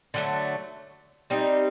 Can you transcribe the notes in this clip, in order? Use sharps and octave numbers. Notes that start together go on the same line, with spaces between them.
D3 F#3 A3
G3 C4 D#4